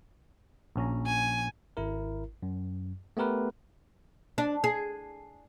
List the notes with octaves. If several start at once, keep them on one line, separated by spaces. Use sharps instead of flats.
A#1 C#4 A#5
G#5
G#1 E4 A#4
F#2
A3 B3 G4 A#4 B4
D4
G#4